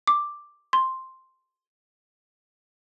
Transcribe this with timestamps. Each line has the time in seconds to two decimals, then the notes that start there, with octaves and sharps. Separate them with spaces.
0.07 D6
0.73 C6